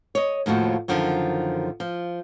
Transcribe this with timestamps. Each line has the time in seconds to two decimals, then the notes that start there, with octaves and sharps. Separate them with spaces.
0.15 C#5 D#5
0.46 D#2 A2 F3 F#4
0.88 F#2 D3 D#3 F3
1.80 F3